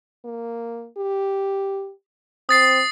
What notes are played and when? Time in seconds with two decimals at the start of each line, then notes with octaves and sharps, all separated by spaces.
0.25 A#3
0.97 G4
2.49 C4 D#6 A6 C7